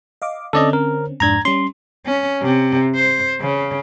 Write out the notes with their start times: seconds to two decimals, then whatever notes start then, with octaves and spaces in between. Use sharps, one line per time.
0.22 D#5 F5 D6
0.53 D3 C4 C#4 A4 D5 D#5
0.73 A#4
1.20 F2 G#2 D4 A#5 G#6
1.45 G3 C#4 C6
2.06 C#4
2.42 C3
2.96 C5
3.41 C#3